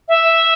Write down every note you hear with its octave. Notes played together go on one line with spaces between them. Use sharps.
E5